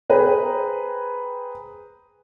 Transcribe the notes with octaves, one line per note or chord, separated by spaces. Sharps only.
G#4 B4 C5 G5 A#5